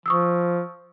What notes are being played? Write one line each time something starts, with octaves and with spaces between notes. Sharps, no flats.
F3 C#6 D#6 E6